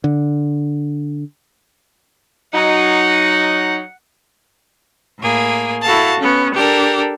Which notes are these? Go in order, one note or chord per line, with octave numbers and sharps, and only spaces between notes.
D3
F#3 D#4 F#5
A2 A#3 G#4
E4 F#4 A4 F5 A5
B3 C#4
D4 G4 A4 A#4